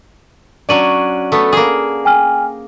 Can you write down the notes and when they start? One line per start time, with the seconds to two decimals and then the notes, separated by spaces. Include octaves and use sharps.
0.69 F#3 C#4 D4 D5 D#7 F#7
1.32 A3 B3
1.53 A#3 G#4
2.05 G5 G#5 F6